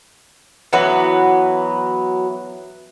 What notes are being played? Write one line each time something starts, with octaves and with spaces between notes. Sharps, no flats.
E3 F#3 B3 B4